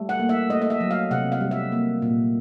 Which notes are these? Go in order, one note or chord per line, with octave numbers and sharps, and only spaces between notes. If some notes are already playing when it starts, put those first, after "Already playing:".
Already playing: G3 A3
F#5
A#3
E5
A3 D#5
D#5
E5
F#3
F5
C3 F#5
F5
G3
E5
A#3
A#2